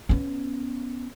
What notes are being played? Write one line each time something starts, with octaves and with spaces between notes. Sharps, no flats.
B3 C#4